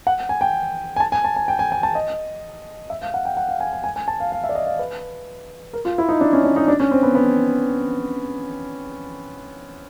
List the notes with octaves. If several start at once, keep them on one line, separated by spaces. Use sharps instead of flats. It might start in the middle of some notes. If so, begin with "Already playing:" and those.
F#5
G#5
G5
G#5
A5
G#5
A5
G#5
G5
G#5
G#5
A5
D#5
E5
F5
F#5
G5
F#5
F5
G#5
G#5
G#5
G#5
A5
F5
F5
E5
D5
D#5
F5
B4
A#4
F4
E4
D#4
D4
C#4
D4
D#4
D4
C#4
C4
B3
B3